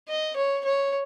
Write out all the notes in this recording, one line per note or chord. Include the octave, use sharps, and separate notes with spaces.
D#5
C#5
C#5